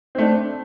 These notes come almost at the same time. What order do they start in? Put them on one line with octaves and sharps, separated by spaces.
C4 A3 D4